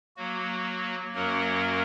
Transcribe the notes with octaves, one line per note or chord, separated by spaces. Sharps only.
F#3 A#3 F#4
F#2 F#3 A#3 F#4 A#4